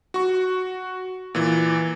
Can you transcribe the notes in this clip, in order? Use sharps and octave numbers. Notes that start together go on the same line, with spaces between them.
F#4 C#6
A#2 E3